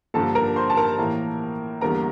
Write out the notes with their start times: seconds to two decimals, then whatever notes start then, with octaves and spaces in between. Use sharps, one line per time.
0.14 G2 D3 F3 A#3 A4 A5
0.35 A#4 A#5
0.56 C5 C6
0.70 A5
0.77 A#4 A#5
0.98 A2 E3 A#3
1.81 E2 D3 G3 A#3 A#4 A#5